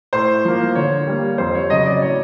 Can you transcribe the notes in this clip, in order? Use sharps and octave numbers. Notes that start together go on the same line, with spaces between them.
A2 C5
F3 A#3
D3 C#5
G3 A#3
F2 C5
C#5
C#3 F#3 D#5
D5
A2 C#5